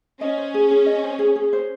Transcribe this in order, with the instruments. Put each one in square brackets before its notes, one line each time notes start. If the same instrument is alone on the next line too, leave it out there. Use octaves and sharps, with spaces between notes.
[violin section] C#4 [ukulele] D#5
[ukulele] C5
G#4
G#4
D#5
C5
G#4
G#4
C5